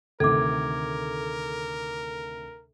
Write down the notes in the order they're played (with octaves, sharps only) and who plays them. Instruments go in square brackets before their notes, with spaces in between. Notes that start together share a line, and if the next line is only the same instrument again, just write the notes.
[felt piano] D2 C3 D#3 [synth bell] A4 [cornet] A#4 [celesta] D6 G#6